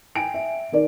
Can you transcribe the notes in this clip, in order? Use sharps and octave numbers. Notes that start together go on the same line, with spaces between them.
G5 G#5 D7
E5
D#3 A#4 D5